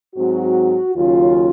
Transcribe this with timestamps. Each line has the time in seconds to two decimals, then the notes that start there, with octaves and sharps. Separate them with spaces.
0.16 G#2 F#3 C4 F#4
0.95 D#2 C#3 F#3 C#4 F4